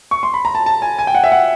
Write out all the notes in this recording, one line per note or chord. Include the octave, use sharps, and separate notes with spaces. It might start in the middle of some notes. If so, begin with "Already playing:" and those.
C#6
C6
B5
A#5
A5
A5
G#5
G#5
G5
F#5
E5
F#5